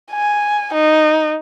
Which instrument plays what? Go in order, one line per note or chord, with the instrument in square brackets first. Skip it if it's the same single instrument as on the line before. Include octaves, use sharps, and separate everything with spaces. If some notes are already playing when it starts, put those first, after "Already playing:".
[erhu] G#5
D#4